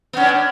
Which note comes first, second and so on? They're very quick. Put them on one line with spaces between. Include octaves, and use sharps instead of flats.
B3 C#4 D4